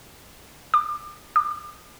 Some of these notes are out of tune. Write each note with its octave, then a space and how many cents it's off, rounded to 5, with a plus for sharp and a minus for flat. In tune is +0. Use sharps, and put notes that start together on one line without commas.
D6 +35
D6 +35